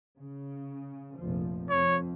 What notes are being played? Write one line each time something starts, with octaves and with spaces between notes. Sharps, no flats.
C#3
F1 A#1 F3
F2 C#5